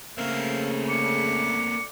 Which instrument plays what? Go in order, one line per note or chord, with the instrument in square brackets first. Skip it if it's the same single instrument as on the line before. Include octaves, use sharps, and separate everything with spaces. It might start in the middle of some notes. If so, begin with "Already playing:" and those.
[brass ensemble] C#3 A3 [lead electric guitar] A#3 C4 [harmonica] A#4 E5 F5
[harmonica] D3 D6 [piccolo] C#7